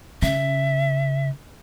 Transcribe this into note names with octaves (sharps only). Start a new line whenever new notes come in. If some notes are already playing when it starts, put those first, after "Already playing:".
C#3 E5